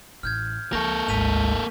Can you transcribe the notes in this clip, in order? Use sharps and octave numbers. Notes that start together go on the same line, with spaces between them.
A1 F6 G6 G#6
C#2 F3 A#3 A4 C#6 G6 A#6
G#1 D2 G#3 C4 B6 D#7 F7